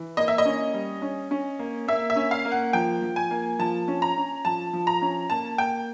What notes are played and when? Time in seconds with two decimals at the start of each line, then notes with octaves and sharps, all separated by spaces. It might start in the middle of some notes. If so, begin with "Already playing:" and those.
Already playing: E3
0.17 A#3 D#5
0.28 E5
0.38 D#5
0.46 C#4
0.73 G3
1.02 C#4
1.31 C#4
1.59 A#3
1.88 A#3 E5
2.10 E5
2.16 C#4
2.31 F5
2.45 A#3
2.52 F#5
2.73 F3 G5
3.02 F3
3.16 G#5
3.31 A#3
3.59 F3 A5
3.88 C#4
4.02 A#5
4.17 C#4
4.45 F3 A5
4.73 F3
4.87 A#5
5.02 C#4
5.30 A#3 A5
5.58 A#3 G5